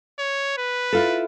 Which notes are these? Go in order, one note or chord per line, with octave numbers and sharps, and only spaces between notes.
C#5
B4
E4 F4 A4